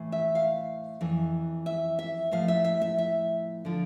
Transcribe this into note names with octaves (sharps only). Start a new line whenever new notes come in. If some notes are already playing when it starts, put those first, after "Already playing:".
Already playing: A2 E3
E5
F5
F2 E3
E5
E5
A2 F3 F5
E5
E5
E5
E5
D3 F3